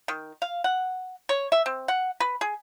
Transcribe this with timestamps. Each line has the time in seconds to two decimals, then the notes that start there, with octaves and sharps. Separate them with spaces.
0.08 D#3
0.42 F5
0.64 F#5
1.29 C#5
1.52 E5
1.66 C4
1.88 F#5
2.20 B4
2.41 G#4